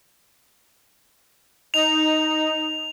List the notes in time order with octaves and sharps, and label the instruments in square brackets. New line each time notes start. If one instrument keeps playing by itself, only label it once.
[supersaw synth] D#4 [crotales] F7